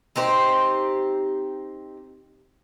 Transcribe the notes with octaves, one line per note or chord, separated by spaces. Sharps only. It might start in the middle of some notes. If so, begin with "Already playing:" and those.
C4 D#4 G4 C5